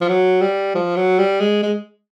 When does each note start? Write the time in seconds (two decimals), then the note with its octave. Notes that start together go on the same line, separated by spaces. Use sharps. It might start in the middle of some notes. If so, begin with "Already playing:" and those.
0.01 F3
0.09 F#3
0.41 G3
0.75 F3
0.96 F#3
1.19 G3
1.40 G#3
1.63 G#3